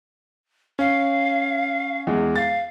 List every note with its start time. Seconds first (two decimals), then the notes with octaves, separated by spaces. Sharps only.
0.79 C#4 F5
2.07 E2 G#3
2.36 F5 A6